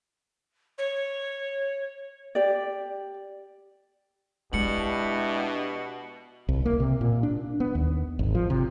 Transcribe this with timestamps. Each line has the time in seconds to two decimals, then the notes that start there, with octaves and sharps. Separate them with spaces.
0.78 C#5
2.35 G4 D5
4.53 B2 G#3 D4 E4 G4 C#7 F#7
6.48 C2
6.66 A#3
6.80 C3
7.01 A#2
7.23 D4
7.60 B3
7.75 D#2
8.19 G#1
8.35 F3
8.50 C3